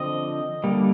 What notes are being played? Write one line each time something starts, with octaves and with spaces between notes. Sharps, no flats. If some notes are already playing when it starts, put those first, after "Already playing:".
Already playing: D3 F3 C4 D#5
D3 G3 A#3